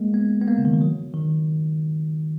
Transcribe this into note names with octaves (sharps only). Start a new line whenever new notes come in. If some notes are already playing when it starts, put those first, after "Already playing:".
Already playing: G#3 A#3
B3
B3
A#3
C#3
D#3
E3
F#3
D#3